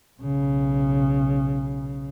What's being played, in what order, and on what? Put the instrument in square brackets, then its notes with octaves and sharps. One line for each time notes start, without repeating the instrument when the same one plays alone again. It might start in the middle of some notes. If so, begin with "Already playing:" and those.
[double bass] B1 C#3